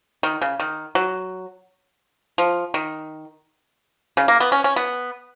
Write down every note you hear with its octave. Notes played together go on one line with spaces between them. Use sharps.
D#3
C#3
D#3
F#3
F3
D#3
C#3
A#3
B3
C#4
C#4
B3